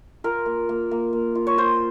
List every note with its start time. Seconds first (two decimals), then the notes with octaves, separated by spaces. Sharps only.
0.24 F4 A#4
0.46 A#3
0.69 A#3
0.91 A#3
1.13 A#3
1.35 F4
1.47 C#5
1.58 F4 C5